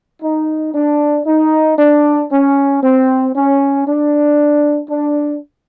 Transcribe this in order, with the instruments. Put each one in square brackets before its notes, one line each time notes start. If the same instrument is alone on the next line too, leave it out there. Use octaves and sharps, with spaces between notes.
[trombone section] D#4
D4
D#4
D4
C#4
C4
C#4
D4
D4